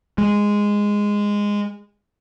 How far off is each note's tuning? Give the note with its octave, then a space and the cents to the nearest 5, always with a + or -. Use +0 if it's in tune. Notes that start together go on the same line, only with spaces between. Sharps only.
G#3 -10